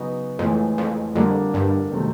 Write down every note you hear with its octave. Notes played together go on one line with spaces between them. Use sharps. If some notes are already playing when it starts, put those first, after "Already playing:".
Already playing: C#3 F#3 B3 D#4 F#4
F2 A2 E3 G#3
F2
F2 D3 G3 A#3 D4
G2
C3 D#3 F#3 A3 C4